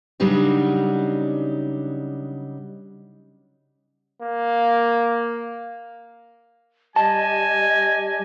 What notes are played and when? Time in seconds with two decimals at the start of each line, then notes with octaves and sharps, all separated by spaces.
0.20 C#3 F#3 G3 D4 D#4 F#4
4.22 A#3
6.96 G3 G4 D#5 G#5 A5